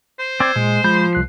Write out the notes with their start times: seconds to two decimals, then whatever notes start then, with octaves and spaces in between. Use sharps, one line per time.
0.19 C5
0.40 C4 D5 E6 G#6
0.56 A#2 G#3
0.84 F3 G#3 B5 G6
1.13 C2 F#6 C7